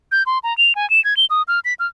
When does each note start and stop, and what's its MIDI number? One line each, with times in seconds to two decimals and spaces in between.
0.12 0.23 91
0.26 0.39 84
0.43 0.56 82
0.58 0.73 101
0.75 0.89 80
0.90 1.03 100
1.04 1.17 92
1.17 1.26 103
1.30 1.42 87
1.48 1.60 89
1.65 1.74 95
1.80 1.87 89